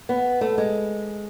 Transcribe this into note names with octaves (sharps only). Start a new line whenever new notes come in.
B3
A3
G#3